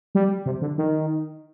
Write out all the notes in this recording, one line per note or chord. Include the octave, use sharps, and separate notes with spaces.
G3
C3
D3
D#3